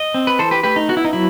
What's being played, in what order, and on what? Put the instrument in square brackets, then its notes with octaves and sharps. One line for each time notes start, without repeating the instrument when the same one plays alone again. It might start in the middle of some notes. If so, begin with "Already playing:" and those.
Already playing: [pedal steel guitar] D#5
C4
B4
E3 A4 C5
G4 B4
A3 G4 B4
D#4
B3 F#4
E4
D#4
F#3 E4